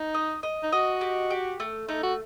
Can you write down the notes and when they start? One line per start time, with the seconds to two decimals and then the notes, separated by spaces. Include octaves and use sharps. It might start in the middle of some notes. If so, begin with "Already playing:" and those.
Already playing: D#4
0.14 D#5
0.43 D#5
0.63 D#4
0.72 F#4 D#5
1.01 G4
1.30 G4
1.60 A3
1.89 A3 D#4
2.03 F#4